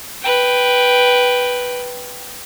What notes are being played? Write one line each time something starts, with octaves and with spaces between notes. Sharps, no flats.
B4 G5